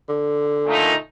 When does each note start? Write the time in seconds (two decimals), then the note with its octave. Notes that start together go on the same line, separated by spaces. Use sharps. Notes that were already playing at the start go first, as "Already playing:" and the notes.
0.09 D3
0.65 A#2 A3 D#4